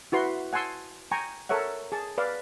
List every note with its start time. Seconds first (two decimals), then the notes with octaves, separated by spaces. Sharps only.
0.12 E4 F#4 B4 C6
0.53 F#5 G#5 A5 C6 E6
1.11 G5 G#5 A#5 C#6
1.49 A4 A#4 C#5 E5 F#5
1.92 G#4 A5
2.18 B4 D5 F5